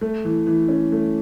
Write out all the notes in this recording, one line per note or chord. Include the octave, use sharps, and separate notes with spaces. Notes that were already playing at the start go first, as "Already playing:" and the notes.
A3
E3
E3
C#4
A3